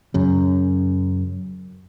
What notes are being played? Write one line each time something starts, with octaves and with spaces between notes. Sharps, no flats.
F#2 C#3